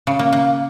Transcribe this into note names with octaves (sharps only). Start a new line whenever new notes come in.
C#3
A#3
A#3